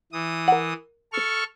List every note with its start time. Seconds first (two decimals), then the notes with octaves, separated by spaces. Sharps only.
0.12 E3 D#6
0.48 A#4 F#5
1.13 A4 C#6 F6